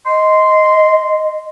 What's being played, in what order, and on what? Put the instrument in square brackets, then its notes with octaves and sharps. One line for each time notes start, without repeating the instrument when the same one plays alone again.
[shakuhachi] D#5 [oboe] C6